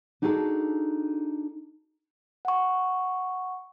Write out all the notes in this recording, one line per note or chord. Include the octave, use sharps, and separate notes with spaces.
D4 D#4 F#4 G#4 A4 A5
F#5 C#6